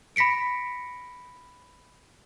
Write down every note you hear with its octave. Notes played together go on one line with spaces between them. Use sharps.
B5 A#6 B6 C#7 D7